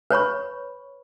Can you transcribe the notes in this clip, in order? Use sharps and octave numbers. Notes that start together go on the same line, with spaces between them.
B4 C#5 B5 C#6